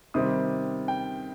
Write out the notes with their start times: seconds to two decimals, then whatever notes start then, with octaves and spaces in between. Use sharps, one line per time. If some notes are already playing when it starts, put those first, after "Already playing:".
0.14 C3 D#3 G3 C4 D#6
0.88 G5